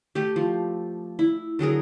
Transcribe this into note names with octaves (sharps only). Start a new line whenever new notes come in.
A3 G4
F3
E4
D3 F#3 G#4 A#4